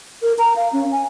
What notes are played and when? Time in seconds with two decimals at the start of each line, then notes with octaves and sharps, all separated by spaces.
0.22 A#4
0.39 A#5
0.56 F5
0.73 C#4
0.92 G#5